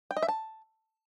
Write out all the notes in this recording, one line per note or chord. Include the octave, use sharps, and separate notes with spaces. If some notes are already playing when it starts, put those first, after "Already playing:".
G5
D#5
E5
A5